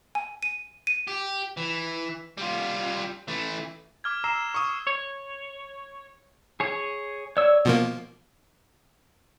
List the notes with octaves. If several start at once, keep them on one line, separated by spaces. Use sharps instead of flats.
G#5
D#7
D#7
G4
E3
G3 F4
E3 A3
D6 F6 G#6
A#5 E6 C7 E7
C#6 D#6
C#5
G#4 C#5
C#5 D5 E6
B2 F3 A#3